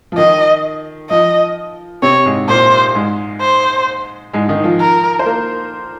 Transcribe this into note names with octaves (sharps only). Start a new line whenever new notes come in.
F3
D#3 D#5
F3 D#5
C3 C4 C#5
G#2 G#3
A#2 A#3 C5
G#2 G#3
C5
G#2 G#3
D#3 D#4
F3 F4
A#4
C5
A#3 A#4